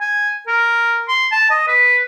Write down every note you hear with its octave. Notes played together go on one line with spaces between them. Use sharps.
G#5
A#4
C6
A5
D#5
B4